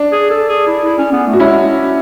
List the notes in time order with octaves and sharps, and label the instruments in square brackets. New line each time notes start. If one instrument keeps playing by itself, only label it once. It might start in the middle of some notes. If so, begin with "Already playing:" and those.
Already playing: [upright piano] D4
[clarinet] G#4
A4
G#4
E4
E4
C#4
B3
A3
[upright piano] F#4
[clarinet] G#3 [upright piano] C#4 E4